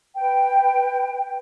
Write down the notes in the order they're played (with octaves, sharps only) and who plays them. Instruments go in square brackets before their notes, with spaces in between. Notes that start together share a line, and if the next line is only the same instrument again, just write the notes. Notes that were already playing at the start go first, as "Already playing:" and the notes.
[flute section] B4 G5